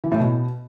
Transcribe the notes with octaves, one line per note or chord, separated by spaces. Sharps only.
E3
A2
B2